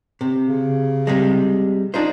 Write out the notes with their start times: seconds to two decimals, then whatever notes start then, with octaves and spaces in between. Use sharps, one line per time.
0.21 C3
0.48 C#3
1.07 C3 G3 G#3
1.94 D4 D#4 F4 C5